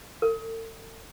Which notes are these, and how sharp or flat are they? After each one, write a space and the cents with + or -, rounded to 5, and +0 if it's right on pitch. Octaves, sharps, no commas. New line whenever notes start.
A4 +40